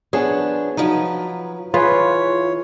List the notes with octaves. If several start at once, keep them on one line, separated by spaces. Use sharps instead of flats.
F3 B3 D4 G#4 C#5
F3 F#3 D#4 B4
E3 F4 G#4 B4 C#5